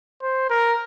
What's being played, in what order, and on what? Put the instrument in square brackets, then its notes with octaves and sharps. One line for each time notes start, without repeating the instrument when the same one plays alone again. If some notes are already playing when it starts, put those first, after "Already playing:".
[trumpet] C5
A#4